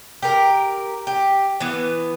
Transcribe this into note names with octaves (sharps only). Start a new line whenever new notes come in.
G4 A#4
G4
E3 B3